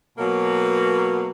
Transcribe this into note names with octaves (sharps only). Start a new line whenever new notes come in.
B2 F#3 A#3